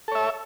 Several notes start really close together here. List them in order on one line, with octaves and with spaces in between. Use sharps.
A4 C#5 E5